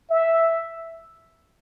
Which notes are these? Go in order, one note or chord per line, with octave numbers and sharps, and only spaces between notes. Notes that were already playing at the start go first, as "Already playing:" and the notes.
E5